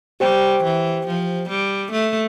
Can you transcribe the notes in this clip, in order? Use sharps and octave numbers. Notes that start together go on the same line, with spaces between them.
G3 G4 C5 G5
E3
F3
G3
A3